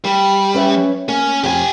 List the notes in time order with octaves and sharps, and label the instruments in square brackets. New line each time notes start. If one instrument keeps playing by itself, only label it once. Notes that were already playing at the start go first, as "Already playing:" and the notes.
[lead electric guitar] G3
[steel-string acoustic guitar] C#4 B4 E5
[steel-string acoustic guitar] A#3 [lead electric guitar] C#4
[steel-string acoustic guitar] F2 [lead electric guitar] G4 G#5